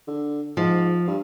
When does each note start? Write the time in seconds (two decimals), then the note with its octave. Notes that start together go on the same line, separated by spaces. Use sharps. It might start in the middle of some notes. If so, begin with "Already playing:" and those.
0.07 D3
0.57 G#2 F3
1.07 G2